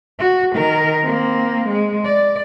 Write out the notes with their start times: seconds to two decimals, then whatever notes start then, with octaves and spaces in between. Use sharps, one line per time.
0.19 F#4
0.55 D#3 A#4
1.02 A#3 C4
1.69 G#3
2.04 D5